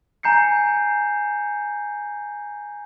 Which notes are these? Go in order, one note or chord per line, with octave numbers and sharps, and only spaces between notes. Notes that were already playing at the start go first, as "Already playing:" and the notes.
G#5 A#5 G6 C7 C#7